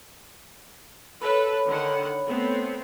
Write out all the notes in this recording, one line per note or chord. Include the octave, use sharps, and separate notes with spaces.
A4 B4 C#5 B5
D3 D#3 F#5
A3 B3 C4